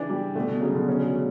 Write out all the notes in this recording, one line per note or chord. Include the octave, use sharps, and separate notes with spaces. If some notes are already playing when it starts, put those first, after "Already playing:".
Already playing: C#3 E3 D4
G3
B2 D3 A3
B2
C#3 F#3
B2 D3
C#4
C#3
A3